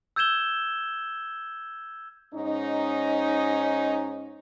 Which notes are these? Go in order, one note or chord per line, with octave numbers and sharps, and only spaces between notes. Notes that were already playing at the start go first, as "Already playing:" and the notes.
E6 G6 G#6 E7 G7
G#2 C#4 D#4